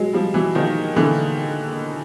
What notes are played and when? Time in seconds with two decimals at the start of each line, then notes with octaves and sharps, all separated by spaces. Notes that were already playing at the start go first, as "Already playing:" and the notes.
Already playing: F#3 G#3
0.13 F3 G3
0.34 E3 F#3
0.55 D#3 F3
0.96 D3 E3